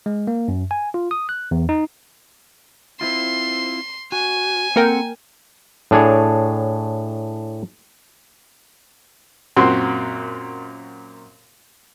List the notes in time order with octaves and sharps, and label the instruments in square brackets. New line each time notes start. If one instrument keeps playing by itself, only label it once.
[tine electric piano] G#3
A#3
F#2
G#5
F4
D#6
F#6
E2
D#4
[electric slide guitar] C4 E4 F4 [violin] C6
[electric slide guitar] F#4 [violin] G#5
[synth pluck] A#3 A#4 G5 [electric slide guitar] C4 A4 F#5
[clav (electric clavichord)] A2 D4 G#4 C#5
[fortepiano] F#2 A#2 C4 F#4 C6